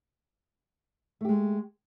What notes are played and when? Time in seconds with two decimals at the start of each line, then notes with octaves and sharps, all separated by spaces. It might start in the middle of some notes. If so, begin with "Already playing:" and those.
1.21 A3
1.25 G4
1.29 G#3